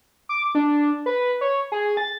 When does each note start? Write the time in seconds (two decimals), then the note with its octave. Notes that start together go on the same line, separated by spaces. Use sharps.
0.29 D6
0.55 D4
1.06 B4
1.41 C#5
1.72 G#4
1.97 A6